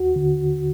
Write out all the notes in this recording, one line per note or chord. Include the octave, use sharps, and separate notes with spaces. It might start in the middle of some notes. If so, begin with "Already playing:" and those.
Already playing: D#2 F#4
D3